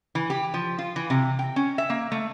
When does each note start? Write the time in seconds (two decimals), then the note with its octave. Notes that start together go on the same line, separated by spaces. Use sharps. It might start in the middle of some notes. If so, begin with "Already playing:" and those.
0.15 E3
0.30 G4
0.54 F3
0.78 F4
0.96 E3
1.10 C3
1.39 G5
1.56 C#4
1.78 E5
1.90 A#3
2.12 A3